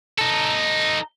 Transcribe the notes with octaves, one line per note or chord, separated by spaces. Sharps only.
D#4 A4